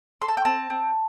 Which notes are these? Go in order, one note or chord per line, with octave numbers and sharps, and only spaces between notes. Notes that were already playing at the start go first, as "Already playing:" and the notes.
A4 C6
A5
G5
C4 A5
C4